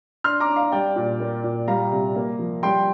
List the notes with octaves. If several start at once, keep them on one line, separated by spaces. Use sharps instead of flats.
D4 C6 F6
A#5 D6
D4
F5
G3 D5 G5
A#2
A#3
A#2
G3 F5 A#5
C3
A#3
F3
G3 G5 C6